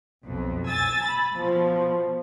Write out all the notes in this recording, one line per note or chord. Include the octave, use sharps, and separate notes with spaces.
B1 F2
G#5 E6 A6
B5
B2 F3